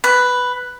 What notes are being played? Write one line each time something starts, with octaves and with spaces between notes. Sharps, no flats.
B4